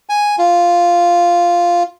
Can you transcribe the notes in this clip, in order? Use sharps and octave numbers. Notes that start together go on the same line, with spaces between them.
G#5
F4